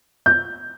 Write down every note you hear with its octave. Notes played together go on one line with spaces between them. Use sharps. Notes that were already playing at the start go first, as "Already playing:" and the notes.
G6